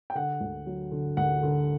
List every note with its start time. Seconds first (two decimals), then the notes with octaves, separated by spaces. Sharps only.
0.10 G5
0.15 D3 F#5
0.41 D2
0.66 F#3
0.91 D3
1.17 D2 F#5
1.43 D3